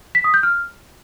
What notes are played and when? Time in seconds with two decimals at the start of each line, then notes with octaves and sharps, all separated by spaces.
0.15 B6
0.24 D#6
0.34 G6
0.43 F6